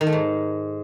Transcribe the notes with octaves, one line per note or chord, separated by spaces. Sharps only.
D#3
A3
G#2